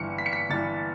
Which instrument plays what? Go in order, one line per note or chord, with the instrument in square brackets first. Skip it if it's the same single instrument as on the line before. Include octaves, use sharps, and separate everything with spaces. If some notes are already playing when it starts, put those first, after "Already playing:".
Already playing: [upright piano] G1 G2 E3 C#7
B6
C#7
B6
G1 G2 E3 A6